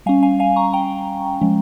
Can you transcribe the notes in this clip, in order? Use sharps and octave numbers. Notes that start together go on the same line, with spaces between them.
G3 C#4 F5 G#5
F5 G#5
F5 G#5
A#5 C#6
G5 A#5
F3 G#3 C#4